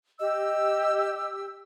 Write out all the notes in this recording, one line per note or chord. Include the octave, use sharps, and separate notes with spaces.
G4 D#5 E6